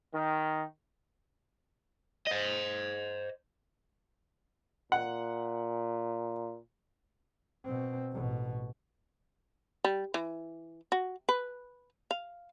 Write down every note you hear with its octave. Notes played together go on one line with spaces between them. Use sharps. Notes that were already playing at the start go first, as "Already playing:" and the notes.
D#3
C5 D#5
A#2 F#5
B2 C4
A1 B2
G3
E3
F#4
B4
F5